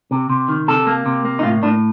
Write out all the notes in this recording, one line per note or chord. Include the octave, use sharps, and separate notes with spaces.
C3
C3
D#3
C3 A4
A#3
C3
A#3
D#4
A2 F4
A2 D4